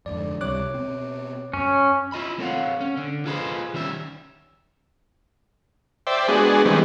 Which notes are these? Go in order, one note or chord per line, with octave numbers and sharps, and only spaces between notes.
F2 G#2 D3 D5
C#2 C3 G3 C#5 D6 F#6
B2 C4
F#2 C#4
E4 F4 D#5 B5
C4 A4 C#5 F5 F#5
C#4
D3
F4 G#4 A4 B4 C5 D#5
D#3 G3 C#4 E5
C5 D5 E5 G5
G#3 B3 D4 F#4 G#4
D#3 E3 G3 G#3 B3 C4